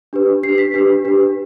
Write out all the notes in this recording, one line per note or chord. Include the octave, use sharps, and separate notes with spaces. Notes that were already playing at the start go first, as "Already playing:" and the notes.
D4 G4 B4
D4 G4 B4 C7
B6
D4 G4 B4
D4 G4 B4